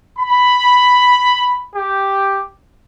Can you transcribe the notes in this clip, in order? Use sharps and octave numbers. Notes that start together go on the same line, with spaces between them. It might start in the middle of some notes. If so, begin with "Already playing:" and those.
B5
G4